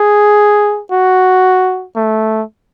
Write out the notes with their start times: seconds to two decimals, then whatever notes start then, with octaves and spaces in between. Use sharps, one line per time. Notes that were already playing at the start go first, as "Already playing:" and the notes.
Already playing: G#4
0.92 F#4
1.96 A3